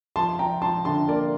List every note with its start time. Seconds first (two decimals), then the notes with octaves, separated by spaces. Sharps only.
0.16 F3 A5 C6
0.39 F3 G5 A#5
0.62 F3 A5 C6
0.85 D3 A5 C6
1.08 A#3 A#4 D5